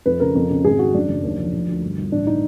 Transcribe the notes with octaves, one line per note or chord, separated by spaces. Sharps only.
F2 B4
C#3 A#4
F2
C#3
G#1 G#4
D#3 F#4
F#2 D4
F#1
D#2
F3
F3
D2
G1
G1
A1 D4
A2 D#4